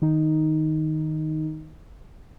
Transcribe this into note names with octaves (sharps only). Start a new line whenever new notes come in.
D#3 D#4